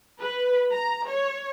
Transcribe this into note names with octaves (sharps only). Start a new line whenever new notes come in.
B4
A#5
C#5